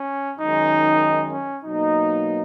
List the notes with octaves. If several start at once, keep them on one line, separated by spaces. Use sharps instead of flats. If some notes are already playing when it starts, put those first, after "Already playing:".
Already playing: C#4
F#2 D#3 G#3 D#4
C#4
B2 F#3 A#3 D#4